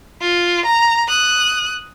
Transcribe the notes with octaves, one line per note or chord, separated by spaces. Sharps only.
F4
A#5
D#6 F#6